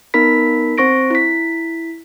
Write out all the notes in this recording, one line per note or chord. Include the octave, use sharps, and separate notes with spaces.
B3 D#4 A#4 B5 B6
C4 C5 C#6 A#6 D7
E4 B6